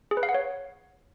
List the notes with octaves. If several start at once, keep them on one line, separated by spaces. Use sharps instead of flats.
G#4
B4
F5
F#5
C#5